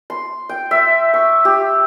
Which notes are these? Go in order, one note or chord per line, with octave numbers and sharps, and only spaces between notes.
C6
G5
E5
C#6
G4